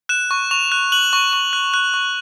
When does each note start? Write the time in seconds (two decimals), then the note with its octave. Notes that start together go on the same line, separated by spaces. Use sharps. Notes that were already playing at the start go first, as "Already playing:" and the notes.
0.09 F#6 E7
0.31 C#6
0.51 C#6 F7
0.72 F#6
0.92 F#6 F#7
1.13 C#6
1.33 C#6
1.53 F#6
1.74 F#6
1.94 C#6